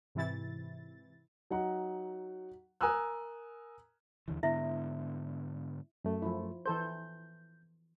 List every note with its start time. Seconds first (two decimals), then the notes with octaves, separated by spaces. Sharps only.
0.15 G#2 C3 E3 E4 A6
1.51 F#3 D#4 F#5 A#5
2.81 A#4 G#5 A#5 D#6 E6 F#6
4.28 D#2 D3 E3
4.43 G#2 D3 B3 E4 E5
6.04 F#2 A3
6.22 F3 E4
6.66 E3 A4 C5 G6